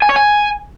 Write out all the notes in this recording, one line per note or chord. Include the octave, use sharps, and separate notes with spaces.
G#5
C#5
G#5